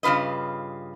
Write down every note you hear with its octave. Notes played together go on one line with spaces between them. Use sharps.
G2 C#3 F4 B4 D#5